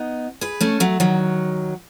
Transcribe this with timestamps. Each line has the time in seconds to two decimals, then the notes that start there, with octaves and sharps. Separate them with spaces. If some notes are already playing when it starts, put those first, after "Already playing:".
Already playing: B3 D#4
0.41 G#4 B4
0.61 A3 C#4
0.80 F#3 A3
1.00 D#3 F#3